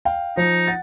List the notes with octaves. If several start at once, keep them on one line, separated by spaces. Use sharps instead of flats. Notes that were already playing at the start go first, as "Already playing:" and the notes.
F5 G5
F3 D#4
F#5 A6